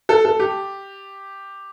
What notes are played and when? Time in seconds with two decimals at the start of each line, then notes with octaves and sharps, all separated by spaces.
0.09 A4
0.25 A4
0.40 G4